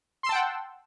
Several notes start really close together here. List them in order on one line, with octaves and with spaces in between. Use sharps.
C6 E6 A5 G5 F#5